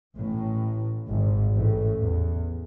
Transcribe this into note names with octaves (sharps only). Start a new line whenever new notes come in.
A1 A2
G#1 G#2
A1 A2
E2